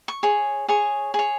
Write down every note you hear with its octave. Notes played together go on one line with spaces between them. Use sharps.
C#6
G#4 C#5
G#4 C#5 C#6
G#4 C#5